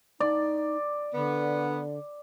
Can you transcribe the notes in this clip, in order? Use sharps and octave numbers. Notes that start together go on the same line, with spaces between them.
D#4 D5
D3 B3